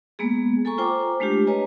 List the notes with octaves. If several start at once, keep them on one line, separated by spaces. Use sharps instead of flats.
G#3 A#3 B3 G#4
A4 G#5 A#5 C#6
F4 C5 G5 G#5 A#5 D6
G#3 A3 D4 F4 G4
B4 C#5 D#5 G#5 A#5